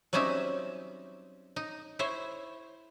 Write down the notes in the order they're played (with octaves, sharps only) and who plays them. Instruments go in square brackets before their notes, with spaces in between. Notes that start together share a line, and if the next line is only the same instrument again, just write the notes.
[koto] F#3 G3 C4 C#4 D#4 E5
D#4
E4 C5 C#5